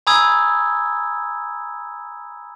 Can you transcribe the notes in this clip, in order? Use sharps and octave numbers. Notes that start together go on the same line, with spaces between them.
G#5 A#5 B5 D#6 E6 G#6